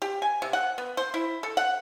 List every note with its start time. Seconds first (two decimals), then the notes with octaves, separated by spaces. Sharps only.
0.02 G4
0.22 G#5
0.42 C3
0.53 F#5
0.78 B3
0.97 C5
1.14 E4
1.43 A4
1.57 F#5